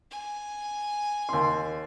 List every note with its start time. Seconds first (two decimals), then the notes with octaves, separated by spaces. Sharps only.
0.11 G#5
1.29 D#2 C6